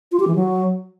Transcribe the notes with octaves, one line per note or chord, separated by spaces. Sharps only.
F4
G4
E3
F#3